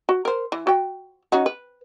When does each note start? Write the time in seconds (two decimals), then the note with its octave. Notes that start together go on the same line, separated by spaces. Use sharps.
0.09 F#4
0.25 A#4 C5
0.52 E3
0.67 F#4 G5
1.32 C#4 D#4 F#4
1.46 B4